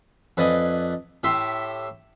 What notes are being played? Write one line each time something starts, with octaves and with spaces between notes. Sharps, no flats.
F2 B4 D5 D#5 G#5
A2 G4 E5 C6